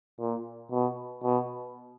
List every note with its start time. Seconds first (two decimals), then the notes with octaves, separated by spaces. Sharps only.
0.20 A#2
0.71 B2
1.23 B2